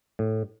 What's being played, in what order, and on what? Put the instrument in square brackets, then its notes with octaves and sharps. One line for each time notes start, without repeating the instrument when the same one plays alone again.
[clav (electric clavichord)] A2